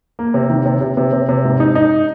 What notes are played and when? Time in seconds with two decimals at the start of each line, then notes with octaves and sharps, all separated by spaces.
0.19 A#3
0.34 C3
0.50 D#3
0.66 C3
0.81 C3
0.97 C3
1.13 C3
1.29 C3
1.44 G#2
1.60 D#4
1.75 D#4